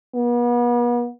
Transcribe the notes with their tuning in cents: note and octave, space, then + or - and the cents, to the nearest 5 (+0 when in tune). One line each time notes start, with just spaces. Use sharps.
B3 -40